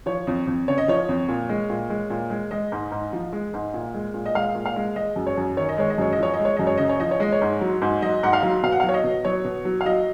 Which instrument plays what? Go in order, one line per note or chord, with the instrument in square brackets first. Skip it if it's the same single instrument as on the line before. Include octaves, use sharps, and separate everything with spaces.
[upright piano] F3 C#5
F2
F2
C#3 C#5
D#5
F3 C#5
F2
A#2
G#3
A#2
G#3
A#2
G#3
G#3 D#5
G#2
G#2
F3
G#3
G#2
A#2
G#3
A#2
D#5
G#3 F5
A#2
F5
G#3
G#3 D#5
F#2
C#5
F#2
D#3 C#5
D#5
G#3 C#5
D#5
F#2 C#5
D#5
F3 C#5
D#5
G#3
C#5
F#2 D#5
C#5
C#3 D#5
C#5
F3 D#5
C#5
G#3 D#5
C#5
G#2
F#3
G#2
F#3 D#5
G#2 F#5
F5
F#3
B2 F5
F#5
F#3 F5
C#5
D#5
B2
F#3 C#5
B2
F#3
F5
F#3 D#5